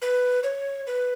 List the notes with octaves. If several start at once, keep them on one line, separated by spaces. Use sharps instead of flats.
B4
C#5
B4